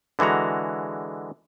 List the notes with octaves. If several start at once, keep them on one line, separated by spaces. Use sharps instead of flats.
D3 E3 G#3 F#4 A#5